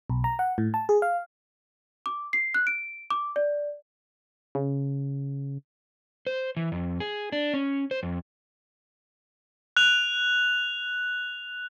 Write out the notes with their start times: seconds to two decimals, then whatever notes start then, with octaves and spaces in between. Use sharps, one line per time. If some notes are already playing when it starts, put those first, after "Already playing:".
0.10 B1
0.24 A#5
0.39 F#5
0.58 A2
0.74 A5
0.89 G#4
1.02 F5
2.06 D6
2.33 C7
2.54 F#6
2.67 D7
3.11 D6
3.36 D5
4.55 C#3
6.27 C5
6.57 E3
6.72 F2
7.00 G#4
7.32 D4
7.54 C#4
7.91 C5
8.03 F2
9.77 F#6 F7